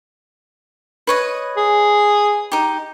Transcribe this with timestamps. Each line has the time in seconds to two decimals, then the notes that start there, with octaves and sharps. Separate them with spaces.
1.07 B4 C#5 D#5
1.57 G#4
2.52 D#4 G4